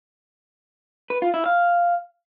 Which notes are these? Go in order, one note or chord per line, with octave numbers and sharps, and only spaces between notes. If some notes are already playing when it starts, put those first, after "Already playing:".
B4
F4
E4
F5